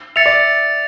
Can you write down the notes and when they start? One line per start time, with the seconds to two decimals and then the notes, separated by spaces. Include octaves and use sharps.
0.16 E5 A6 C#7 F7
0.26 D5